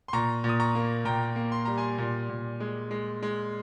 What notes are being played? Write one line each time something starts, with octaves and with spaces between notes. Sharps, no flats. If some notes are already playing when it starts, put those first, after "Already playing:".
C6
A#2 A#5 C#6
A#2
D#6
A#5 C#6
A#3
A#2 G5 A#5
A#3
C6
G3 A#5
G#5 C6
A#2
A#2
G#3
G#3
G#3